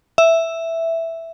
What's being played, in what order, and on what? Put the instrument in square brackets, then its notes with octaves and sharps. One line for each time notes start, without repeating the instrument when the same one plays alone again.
[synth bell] E5